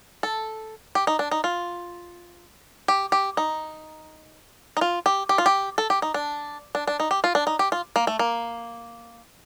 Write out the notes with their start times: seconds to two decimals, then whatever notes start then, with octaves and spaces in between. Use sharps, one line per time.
0.23 A4
0.95 G4
1.07 D#4
1.19 D4
1.31 D#4
1.44 F4
2.88 G4
3.12 G4
3.37 D#4
4.77 D#4
4.81 F4
5.06 G4
5.29 G4
5.38 F4
5.46 G4
5.78 A4
5.90 G4
6.02 D#4
6.14 D4
6.75 D4
6.87 D4
7.00 D#4
7.11 G4
7.24 F4
7.35 D4
7.47 D#4
7.59 G4
7.72 F4
7.96 A#3
8.07 A3
8.19 A#3